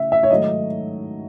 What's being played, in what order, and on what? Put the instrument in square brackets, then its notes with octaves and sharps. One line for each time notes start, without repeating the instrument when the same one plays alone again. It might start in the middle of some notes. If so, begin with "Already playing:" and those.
Already playing: [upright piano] C#3 E3 A3 E5
E5
C#5
G#2 D#3 F#3 A3 D#5